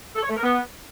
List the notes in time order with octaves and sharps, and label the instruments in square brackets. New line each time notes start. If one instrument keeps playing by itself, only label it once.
[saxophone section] A4
C#5
A3
A#4
B3